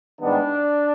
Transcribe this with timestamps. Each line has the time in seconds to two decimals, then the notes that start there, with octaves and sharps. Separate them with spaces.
0.20 G#2 D#3 G3 B3 D4